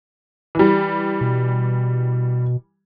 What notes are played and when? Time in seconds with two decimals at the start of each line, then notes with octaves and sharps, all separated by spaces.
0.55 E3 G3
1.21 B2